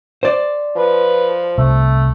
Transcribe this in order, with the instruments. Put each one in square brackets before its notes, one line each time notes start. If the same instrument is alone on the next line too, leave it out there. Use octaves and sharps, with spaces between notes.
[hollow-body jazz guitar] C5 D5
[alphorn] F3 [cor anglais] B4
[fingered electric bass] C2 [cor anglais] A3